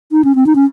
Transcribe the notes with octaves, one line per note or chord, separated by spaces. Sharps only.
D#4
C#4
C4
D#4
C#4